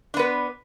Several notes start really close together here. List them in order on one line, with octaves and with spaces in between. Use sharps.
D4 B3 B4